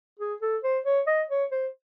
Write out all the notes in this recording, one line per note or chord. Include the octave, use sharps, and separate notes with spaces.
G#4
A4
C5
C#5
D#5
C#5
C5